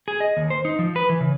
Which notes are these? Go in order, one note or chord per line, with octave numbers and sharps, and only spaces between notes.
G#4
D#5
D#2
C5
D#4
F3
B4
E3
C#3